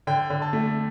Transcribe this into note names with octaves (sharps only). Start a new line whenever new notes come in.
D3 G5
D3
A5
A3